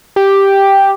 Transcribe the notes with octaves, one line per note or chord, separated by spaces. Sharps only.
G4